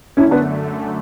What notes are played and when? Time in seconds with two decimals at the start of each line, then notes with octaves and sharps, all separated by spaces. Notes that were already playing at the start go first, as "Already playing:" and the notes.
0.17 F#2 D3 A3 C#4 E4
0.31 B3 D4